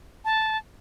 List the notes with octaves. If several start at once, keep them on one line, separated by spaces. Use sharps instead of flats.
A5